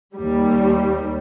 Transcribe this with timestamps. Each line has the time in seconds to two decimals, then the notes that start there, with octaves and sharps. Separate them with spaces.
0.15 D#2 G3